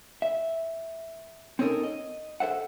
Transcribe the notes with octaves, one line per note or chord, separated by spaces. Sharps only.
E5
C4 C#4 D#4 A4 A#4
D#5
A4 C5 E5 F#5